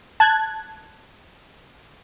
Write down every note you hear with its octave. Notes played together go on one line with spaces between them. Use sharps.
A5 F#6 G#6